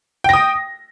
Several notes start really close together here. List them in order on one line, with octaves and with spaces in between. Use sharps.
G5 A#6 D#6